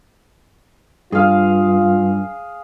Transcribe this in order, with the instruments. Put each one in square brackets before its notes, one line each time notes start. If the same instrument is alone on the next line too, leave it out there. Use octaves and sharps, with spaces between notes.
[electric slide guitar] G2 [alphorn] F4 [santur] G#4 F5